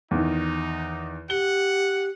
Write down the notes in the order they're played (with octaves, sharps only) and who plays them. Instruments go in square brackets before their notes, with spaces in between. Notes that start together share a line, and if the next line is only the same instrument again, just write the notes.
[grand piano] E2 D#3 [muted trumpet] D#4
[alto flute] G4 [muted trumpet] F#5 [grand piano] G7